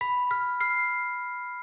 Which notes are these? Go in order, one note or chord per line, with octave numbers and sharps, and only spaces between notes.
B5 B6
F6 B6
F6 C7